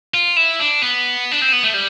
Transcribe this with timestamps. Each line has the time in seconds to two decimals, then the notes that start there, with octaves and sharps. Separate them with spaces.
0.14 F4
0.36 E4
0.60 D4
0.83 B3
1.31 D4
1.42 C4
1.53 B3
1.64 A3
1.74 G3